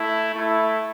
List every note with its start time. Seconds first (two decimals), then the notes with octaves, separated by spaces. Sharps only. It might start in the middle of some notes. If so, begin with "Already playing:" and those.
Already playing: A3 E4
0.35 A3 E4